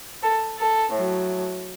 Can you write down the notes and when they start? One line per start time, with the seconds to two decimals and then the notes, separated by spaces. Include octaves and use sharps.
0.23 A4
0.58 A4
0.93 A2 F#3